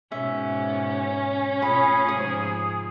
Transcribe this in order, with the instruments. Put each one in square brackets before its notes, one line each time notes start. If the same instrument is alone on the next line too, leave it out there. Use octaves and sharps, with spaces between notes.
[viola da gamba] G#2 B2 [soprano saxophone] C#4 [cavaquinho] E5
[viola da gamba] B2 A3 F4 [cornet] G#4 [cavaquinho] B5
[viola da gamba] G#2 C3 F3 [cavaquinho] D#6